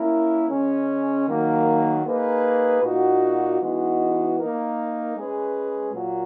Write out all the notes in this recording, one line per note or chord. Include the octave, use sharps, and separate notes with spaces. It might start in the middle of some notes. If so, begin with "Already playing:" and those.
Already playing: A#3 C#4 E4 A#4
C#3 G#3 C#4
D#3 F#3 A#3
A#3 D#4 G#4 B4
A#2 A#3 D#4 F#4
E3 G#3 B3 D#4 F#4
A#3 D#4 A#4
G#3 C#4 G#4 B4
A#2 F#3 A#3